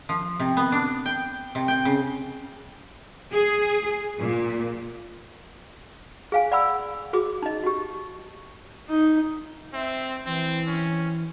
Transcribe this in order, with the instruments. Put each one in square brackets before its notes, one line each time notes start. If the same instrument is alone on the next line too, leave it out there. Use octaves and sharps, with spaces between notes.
[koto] F3
C3
B3
D4
G5
C3
G5
C#3
[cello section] G#4
A#2
[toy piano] G#4 F5 G#5
D5 F#5 B5 E6
F#4 G#4 D6
D#4 D#5
F#4 G4
[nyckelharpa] D#4
[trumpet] C4 [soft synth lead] E5
[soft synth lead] E3 [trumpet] C4
[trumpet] C#4